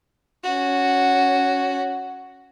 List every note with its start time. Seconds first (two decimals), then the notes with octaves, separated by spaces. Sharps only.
0.44 C#4 F#4